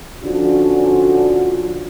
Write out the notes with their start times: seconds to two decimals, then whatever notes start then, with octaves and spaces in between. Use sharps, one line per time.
0.21 D3 F3 C#4 D4 F4 F#4